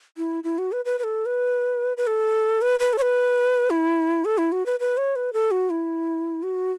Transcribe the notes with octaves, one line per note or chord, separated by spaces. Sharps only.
E4
E4
F#4
B4
B4
B4
A4
B4
B4
A4
B4
B4
A4
C#5
B4
E4
A4
E4
F#4
B4
B4
C#5
B4
A4
F#4
E4
F#4